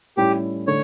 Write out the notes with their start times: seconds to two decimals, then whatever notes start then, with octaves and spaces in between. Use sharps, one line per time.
0.17 A2 G3 C#4 E4 G4
0.67 D3 A3 C#5